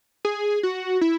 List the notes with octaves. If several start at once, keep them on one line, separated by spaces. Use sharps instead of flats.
G#4
F#4
E4